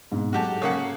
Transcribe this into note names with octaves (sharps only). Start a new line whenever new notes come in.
G#2 B2 C4
F#3 G#3 F#4 G4 A4 A5
C#3 A#3 F#5